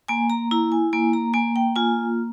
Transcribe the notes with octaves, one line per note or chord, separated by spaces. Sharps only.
A#3 G#5
A#5
E4 A#5
G#5
A#3 G#5
A#5
A#3 G#5
G5
F4 G#5